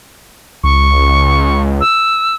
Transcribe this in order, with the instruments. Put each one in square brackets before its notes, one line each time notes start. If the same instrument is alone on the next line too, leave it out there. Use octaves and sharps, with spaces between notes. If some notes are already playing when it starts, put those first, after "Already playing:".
[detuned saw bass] C#2 [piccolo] C#6
[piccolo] E6